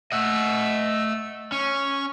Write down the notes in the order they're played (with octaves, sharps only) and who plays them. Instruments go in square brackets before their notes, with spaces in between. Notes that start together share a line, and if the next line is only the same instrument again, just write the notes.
[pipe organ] A3 E6 [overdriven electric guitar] D#5 F#5
[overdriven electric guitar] C#4 [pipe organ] C#6